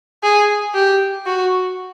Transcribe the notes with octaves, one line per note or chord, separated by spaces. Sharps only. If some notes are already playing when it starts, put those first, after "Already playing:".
G#4
G4
F#4